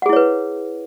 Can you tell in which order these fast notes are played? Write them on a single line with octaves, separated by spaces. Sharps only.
F#5 G#4 E4 C#5 B4